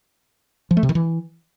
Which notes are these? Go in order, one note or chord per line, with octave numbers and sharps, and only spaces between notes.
F3
A3
C3
D#3
E3